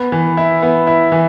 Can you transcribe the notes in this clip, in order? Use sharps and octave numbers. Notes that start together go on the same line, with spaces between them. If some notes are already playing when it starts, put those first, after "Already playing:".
Already playing: B3
E3
E4
B3
E4
E3